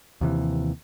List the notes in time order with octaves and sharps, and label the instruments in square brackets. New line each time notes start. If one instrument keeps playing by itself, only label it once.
[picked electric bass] D#2 C3 E3